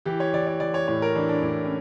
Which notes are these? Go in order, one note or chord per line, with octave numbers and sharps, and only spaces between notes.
E3 G4
C#5
E3 D5
D5
E3 D5
C#5
A2 C#5
A#4
E3 D4
D4
A2 D4
C#4